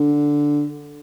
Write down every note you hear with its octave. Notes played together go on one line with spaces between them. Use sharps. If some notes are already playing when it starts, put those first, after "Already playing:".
Already playing: D3